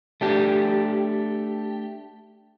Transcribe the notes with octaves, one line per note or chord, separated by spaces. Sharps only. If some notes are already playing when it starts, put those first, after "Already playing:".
A3 D4 G4